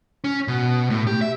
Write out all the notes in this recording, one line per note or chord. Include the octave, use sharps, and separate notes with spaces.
C#4
B2
A2
G4
E5